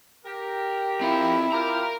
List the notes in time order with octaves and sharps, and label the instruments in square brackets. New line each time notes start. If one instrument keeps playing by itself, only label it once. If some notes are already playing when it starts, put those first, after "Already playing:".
[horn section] G4 A#4
[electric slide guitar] C4 F4 [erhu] E4
[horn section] F4 G4 [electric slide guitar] A#4 A#5